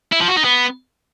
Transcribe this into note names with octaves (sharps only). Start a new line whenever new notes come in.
E4
F3
F#4
D#4
B3